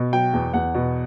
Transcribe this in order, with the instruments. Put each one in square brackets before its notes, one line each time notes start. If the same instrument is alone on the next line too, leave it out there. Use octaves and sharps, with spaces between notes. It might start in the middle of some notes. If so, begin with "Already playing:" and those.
Already playing: [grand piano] B2
F#3 G5
E2
E2 F#5
B2